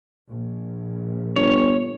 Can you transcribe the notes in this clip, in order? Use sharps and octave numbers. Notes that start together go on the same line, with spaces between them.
A#1
G1 C#5